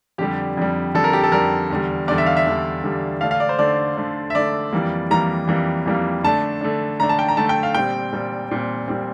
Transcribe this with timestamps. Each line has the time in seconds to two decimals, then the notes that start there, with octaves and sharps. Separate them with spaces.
0.18 F2 D3 G3 G4
0.57 F2 D3 G3
0.95 F2 D3 G3 A4
1.04 A#4
1.13 G4
1.23 A4
1.32 F2 D3 G3 A#4
1.70 E2 D3 G3
2.08 E2 D3 G3 D5
2.18 E5
2.26 F5
2.37 E5
2.46 E2 D3 G3
2.84 E2 D3 G3
3.21 D3 A3 D4 F5
3.31 F5
3.40 D5
3.49 C5
3.59 D3 A3 D4 D5
3.97 D3 A3 D4
4.30 E5
4.35 D3 A3 D4 D5
4.73 F2 E3 G3 A#3
5.10 F2 E3 G3 A#3 A#5
5.48 F2 E3 G3 A#3
5.86 F2 E3 G3 A#3
6.23 D3 A3 D4 A5
6.61 D3 A3 D4
7.00 D3 A3 D4 A#5
7.09 A5
7.19 G5
7.28 A#5
7.37 D3 A3 D4 A5
7.49 G5
7.63 F5
7.75 A#2 G3 C4 G5
8.12 A#2 G3 C4
8.51 A#2 G3 C4
8.88 A#2 G3 C4